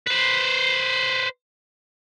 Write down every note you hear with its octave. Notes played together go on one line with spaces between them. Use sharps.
B4 C5